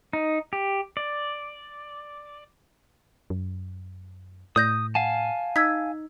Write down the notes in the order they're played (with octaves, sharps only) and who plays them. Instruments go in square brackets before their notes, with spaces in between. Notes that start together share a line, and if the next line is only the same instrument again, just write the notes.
[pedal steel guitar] D#4
G4
D5
[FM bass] F#2
[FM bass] A2 [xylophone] D5 G6 A#6 [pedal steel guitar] D#6
[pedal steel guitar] F5 G#5 A5 [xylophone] F#5
[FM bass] D#4 [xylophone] E6 G#6 B6